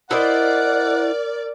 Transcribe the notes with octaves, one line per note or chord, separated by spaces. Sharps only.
E4 A#4 C5 D5 D#5 F#5